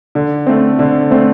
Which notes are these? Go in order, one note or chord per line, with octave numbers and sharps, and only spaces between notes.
D3
A3 C4
D3
A3 C4